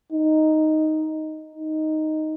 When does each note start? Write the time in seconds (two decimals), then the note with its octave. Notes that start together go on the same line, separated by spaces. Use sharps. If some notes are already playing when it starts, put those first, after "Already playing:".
0.13 D#4
1.56 D#4